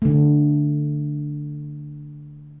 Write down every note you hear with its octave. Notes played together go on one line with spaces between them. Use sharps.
D3 A3